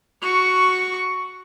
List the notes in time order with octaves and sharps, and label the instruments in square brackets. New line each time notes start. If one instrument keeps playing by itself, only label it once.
[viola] F#4 C#6